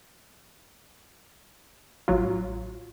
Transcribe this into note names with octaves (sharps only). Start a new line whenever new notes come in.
A1 F#3 F4